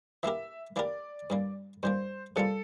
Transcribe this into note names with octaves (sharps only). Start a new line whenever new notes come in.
E3 A#3 E4 G4 A#4 E5
E3 A#3 E4 G4 A#4 D5
G2 E3 A#3
G2 E3 A#3 C5
C3 E3 G3 A#3 F4 A4